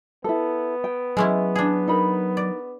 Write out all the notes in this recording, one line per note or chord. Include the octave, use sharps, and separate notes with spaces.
B3 E4 A4
G5
F#3 G#3 C#4 E4
D4 G#4
D#4 A#4 B5
D5